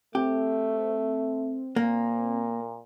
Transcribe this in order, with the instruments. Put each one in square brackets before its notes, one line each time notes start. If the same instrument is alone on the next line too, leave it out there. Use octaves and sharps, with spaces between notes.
[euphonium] A3 [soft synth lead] C4 [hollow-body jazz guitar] G4
[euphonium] A#2 [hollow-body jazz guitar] A#3